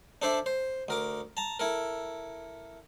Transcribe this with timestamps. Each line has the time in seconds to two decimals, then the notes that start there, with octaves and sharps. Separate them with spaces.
0.22 D4 A4 C5 D5 E5
0.46 C5
0.88 D2 A#4 D6
1.37 A5 A#5
1.59 E4 A4 A#4